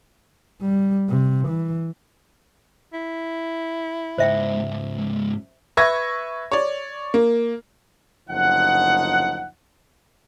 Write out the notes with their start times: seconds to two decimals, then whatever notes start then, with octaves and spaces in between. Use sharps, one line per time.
0.62 G3
1.09 C3
1.49 E3
2.93 E4
4.18 C#2 G#2 C5 E5 G5
5.77 B4 E5 C#6 G#6 A#6
6.52 C#5 D5
7.14 A#3
8.29 F#1 D2 F3 D#4 F#5